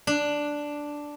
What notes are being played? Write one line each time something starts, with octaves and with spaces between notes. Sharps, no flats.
D4